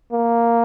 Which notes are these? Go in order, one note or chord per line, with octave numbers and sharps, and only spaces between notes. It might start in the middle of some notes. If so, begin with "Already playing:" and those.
A#3